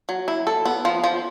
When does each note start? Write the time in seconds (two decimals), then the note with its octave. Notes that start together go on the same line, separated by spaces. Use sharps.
0.09 F#3
0.28 E4
0.47 A4
0.65 B3
0.85 F3
1.04 F3